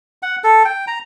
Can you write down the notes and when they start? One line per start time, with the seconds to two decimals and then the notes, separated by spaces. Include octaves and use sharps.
0.23 F#5
0.44 A4
0.65 G5
0.87 A#5